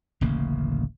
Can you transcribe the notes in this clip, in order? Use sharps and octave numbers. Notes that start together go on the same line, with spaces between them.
D1 A1 C#3 A#3